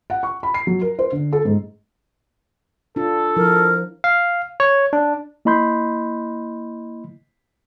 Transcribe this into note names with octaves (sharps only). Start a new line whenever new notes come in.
F#5
C#6
B5
C7
F#3
A#4
C5
D3
A4
G#2
D4 F4 A4
F3 E4 A#4
F5
C#5
D4
A#3 E4 D#5 B5 C6 G6